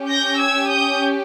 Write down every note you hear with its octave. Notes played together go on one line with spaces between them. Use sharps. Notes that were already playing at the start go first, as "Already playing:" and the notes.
Already playing: C#4 G4
G6 A#6
E6 G#6
D#6 G6